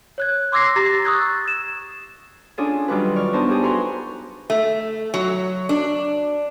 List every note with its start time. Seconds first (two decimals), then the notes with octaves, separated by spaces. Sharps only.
0.18 C#5 F#6 G#6
0.52 C6 D6 E6 G#6 A#6 C7
0.76 G4 A#5 A6 A#6 C7
1.05 C#6 D#6 E6 F#6 G#6 A6
1.48 E7
2.58 C#4 D4 F4 G#4 A4
2.88 D#3 F#3 G3 D4 F4 B4
3.16 D5 C#6 F6
3.33 B3 D4 D#4 C5 A5
3.48 F4 G4 G#4
3.62 F#4 A4 B4 A#5 C6 C#6
4.50 A3
5.14 F#3
5.69 D4